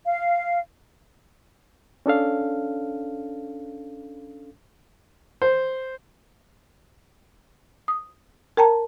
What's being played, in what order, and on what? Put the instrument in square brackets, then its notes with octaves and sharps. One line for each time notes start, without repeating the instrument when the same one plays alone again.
[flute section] F5
[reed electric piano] C#4 D4 A4 F5
[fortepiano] C5
[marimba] D#6
A#4 G5 A5 A#5